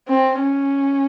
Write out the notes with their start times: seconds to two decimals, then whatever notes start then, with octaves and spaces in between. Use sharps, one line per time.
0.08 C4
0.40 C#4